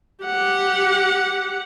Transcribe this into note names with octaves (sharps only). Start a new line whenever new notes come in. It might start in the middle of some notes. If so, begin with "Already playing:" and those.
G4 F#5